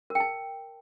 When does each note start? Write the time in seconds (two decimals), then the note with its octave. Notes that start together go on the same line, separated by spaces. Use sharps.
0.10 A#4
0.15 G5
0.20 A5